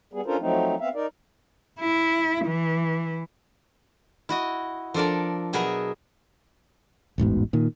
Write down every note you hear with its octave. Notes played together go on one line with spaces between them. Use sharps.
G3 B3 G#4
C#4 D4 F4 A4 A#4 C5
F3 F#3 A3 C4 D#4
B3 C4 E5 F5
D#4 A#4 D5
E4
E3
E4 F#4 D#5
F3 D4 A4 A#4 D5
B2 F#3 B3 G#4 A#4 E5
E1 A1 G#2 B2
A#2 D#3